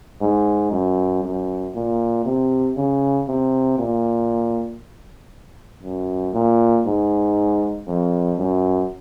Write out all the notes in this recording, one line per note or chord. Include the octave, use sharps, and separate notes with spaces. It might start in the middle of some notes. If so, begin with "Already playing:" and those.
G#2
F#2
F#2
A#2
C3
C#3
C3
A#2
F#2
A#2
G#2
F2
F#2